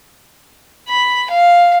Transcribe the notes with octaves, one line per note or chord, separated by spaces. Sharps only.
B5
F5